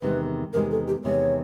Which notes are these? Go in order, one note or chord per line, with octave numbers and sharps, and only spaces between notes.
E2 C3 D#3 G#3 B4
E2 C3 D#3 G#3 A#4
A4
G4
E2 C3 D#3 G#3 C#5